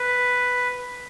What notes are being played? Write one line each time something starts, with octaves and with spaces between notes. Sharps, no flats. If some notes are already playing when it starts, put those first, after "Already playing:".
Already playing: B4